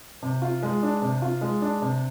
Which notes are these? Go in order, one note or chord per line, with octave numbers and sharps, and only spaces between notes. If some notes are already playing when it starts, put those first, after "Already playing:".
C3
F4
G#3
D4
C3
F4
G#3
D4
C3